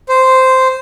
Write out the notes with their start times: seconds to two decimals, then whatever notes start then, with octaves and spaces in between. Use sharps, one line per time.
0.09 C5